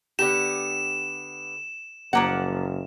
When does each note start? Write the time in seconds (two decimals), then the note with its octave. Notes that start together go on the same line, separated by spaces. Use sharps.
0.19 D3 B3 G4 E7
2.13 F#1 F3 A#3 F#5